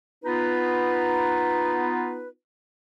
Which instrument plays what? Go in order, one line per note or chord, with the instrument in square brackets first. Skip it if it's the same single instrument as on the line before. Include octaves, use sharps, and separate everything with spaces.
[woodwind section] B3 D#4 F4 B4